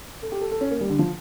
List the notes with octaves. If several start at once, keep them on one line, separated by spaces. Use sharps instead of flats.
A4
G4
A4
A4
C#4
A#3
G3
D3
F3